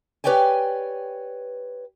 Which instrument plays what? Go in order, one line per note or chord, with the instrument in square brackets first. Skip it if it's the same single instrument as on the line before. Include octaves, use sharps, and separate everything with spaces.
[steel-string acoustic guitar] G4 B4 C#5 D5 G5 G#5